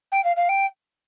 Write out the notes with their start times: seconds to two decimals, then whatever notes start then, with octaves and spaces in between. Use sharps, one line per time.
0.12 G5
0.24 F5
0.36 F5
0.49 G5